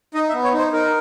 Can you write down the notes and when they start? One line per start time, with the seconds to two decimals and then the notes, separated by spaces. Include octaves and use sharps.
0.14 D#4 D#5
0.29 E5
0.34 B3
0.44 C#5
0.53 D#4 C5
0.73 D#4 A#4